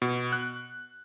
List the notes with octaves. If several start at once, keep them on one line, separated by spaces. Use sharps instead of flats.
B2
F#6